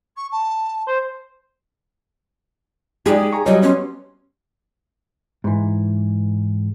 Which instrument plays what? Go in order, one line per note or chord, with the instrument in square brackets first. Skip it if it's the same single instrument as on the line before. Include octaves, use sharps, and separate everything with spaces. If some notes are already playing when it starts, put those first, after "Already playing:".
[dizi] C#6
A5
[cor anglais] C5
[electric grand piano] G#3 D#4 D5 [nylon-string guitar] G4 [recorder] G#4
[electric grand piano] G#5 A#5 C#6
[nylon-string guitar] F#3 G3 C#5 [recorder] D#5
[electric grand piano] B3 C6 [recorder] C#4
[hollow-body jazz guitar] G#2 E3